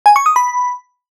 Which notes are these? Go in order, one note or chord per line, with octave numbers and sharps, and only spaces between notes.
G#5
C#6
D#6
B5